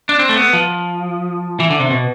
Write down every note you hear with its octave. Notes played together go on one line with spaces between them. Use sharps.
D4
C4
A3
B3
F3
E3
D3
C3
B2